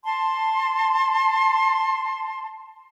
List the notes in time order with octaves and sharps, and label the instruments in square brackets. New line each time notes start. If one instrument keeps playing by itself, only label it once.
[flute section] A5 C6